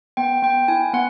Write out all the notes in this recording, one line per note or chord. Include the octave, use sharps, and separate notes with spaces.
B3 G5
B3 G5
E4 G#5
B3 F#5